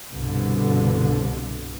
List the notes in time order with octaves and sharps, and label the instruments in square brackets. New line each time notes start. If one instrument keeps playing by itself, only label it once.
[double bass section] C2 G2 B2 D3